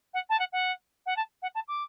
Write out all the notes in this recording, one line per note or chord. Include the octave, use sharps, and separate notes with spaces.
F#5
A5
F#5
F#5
F#5
A5
F#5
A5
D6